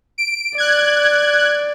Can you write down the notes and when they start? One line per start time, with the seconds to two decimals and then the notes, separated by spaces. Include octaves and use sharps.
0.18 D7
0.58 D5 F#6 G#6